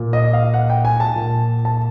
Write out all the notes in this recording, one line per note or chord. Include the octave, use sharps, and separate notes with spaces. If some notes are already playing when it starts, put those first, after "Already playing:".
Already playing: A#2
D#5
F5
F#5
G5
G#5
A5
A#2
A5